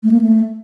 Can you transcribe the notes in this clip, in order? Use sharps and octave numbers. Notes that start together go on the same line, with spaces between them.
A3
A#3
A3